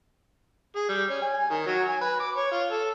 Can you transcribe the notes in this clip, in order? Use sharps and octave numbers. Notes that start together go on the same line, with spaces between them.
G#4
G3
C#4
G#5
D#3
F#3
G#5
B4
D6
C#5
F4
A4